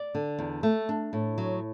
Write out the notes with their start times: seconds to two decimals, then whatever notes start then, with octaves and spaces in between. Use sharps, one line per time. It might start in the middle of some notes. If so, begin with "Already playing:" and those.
Already playing: D5
0.15 D3
0.39 E2
0.63 A3
0.89 D4
1.13 A2
1.38 F#3